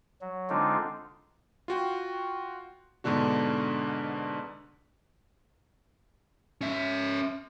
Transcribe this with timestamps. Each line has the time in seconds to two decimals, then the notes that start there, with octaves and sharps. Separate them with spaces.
0.21 F#3
0.50 D3 G#3 C4 D4 D#4 F4
1.68 F4 F#4 G5
3.04 G#2 B2 D3 D4 F#4
6.61 C#4 E5